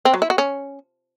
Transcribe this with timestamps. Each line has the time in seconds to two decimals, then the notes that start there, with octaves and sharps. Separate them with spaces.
0.05 C4
0.14 F#3
0.22 E4
0.30 F#4
0.38 C#4